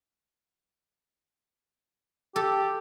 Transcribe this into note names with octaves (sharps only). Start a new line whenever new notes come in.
G4 A4